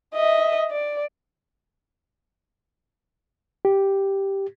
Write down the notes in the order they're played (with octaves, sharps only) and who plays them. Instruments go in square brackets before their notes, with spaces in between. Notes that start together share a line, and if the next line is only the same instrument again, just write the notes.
[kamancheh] D#5 E5
D5
[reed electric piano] G4